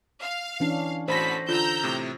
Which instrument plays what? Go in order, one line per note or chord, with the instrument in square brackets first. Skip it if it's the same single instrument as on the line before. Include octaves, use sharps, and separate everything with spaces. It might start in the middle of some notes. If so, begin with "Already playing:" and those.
[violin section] F5
[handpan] E3 C#4 D4
[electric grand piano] A1 B5 A#6 [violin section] F#4 A4 B6 [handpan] C5
[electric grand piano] D3 [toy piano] F4 [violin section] A#5 E6 G6
[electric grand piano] A2 C3